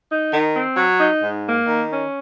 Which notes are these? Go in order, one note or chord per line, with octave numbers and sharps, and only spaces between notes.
D#4
D#3
C4
F#3
D#4
G#2
A#3
D#3
C#4